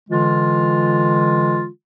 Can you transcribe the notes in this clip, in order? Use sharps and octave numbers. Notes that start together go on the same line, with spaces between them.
D3 E3 G#3 F4